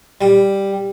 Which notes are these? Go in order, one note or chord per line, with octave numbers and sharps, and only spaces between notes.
G3